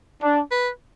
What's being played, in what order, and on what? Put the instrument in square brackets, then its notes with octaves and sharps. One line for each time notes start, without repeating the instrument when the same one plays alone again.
[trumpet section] D4
[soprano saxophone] B4